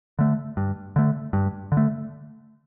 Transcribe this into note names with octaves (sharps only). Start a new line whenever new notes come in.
D3 A3
G2
D3 A3
G2
D3
A3